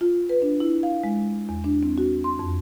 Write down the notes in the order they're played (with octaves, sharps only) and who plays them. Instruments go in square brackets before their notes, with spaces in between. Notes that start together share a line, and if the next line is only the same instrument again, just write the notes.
[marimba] F4
B4
D4
E4
F5
G#3
E2
D4
C4
F#4
C6
F2